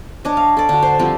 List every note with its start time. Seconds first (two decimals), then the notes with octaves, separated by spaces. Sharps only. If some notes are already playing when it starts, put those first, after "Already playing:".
0.25 D4 C#5 D#5
0.37 F5
0.57 A4 D5
0.69 D3 F#4
0.82 C5
0.99 F3 G3 C4